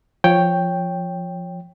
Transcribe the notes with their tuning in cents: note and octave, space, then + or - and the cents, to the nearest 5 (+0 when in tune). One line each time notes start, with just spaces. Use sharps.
F3 +0 C#5 +0 G5 +0